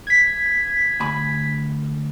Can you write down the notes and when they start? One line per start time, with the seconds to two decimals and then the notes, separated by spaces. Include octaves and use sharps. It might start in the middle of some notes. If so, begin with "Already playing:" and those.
0.07 G#6 B6
1.00 D2 G#5 B5